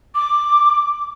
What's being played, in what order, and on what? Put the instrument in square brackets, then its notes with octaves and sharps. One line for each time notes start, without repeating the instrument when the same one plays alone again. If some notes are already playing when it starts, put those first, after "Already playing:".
[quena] D6